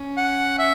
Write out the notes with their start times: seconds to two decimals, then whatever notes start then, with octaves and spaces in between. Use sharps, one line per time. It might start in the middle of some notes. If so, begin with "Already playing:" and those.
Already playing: C#4
0.17 F#5
0.59 E5